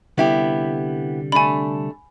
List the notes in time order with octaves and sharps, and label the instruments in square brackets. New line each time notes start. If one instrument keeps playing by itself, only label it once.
[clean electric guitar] C2 D3 G3 [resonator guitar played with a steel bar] B3 E4 G4
[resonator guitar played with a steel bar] A3 D4 [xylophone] G#5 B5